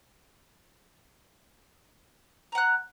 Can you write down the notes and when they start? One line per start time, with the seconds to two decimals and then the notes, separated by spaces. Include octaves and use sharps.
2.52 A#5
2.55 F#5
2.58 F#6